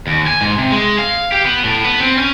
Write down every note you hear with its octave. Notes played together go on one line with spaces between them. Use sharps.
D#2
G#5
G#2
C3
G#3
F5
G4
B3
A2
B3
C4
C#4